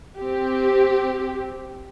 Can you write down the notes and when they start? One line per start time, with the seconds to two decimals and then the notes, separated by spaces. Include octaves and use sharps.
0.18 C4 G4